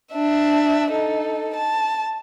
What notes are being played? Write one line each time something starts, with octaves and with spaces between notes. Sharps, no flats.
D4 E5
D#4 A4
A5